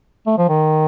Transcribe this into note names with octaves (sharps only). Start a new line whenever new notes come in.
A3
F3
D#3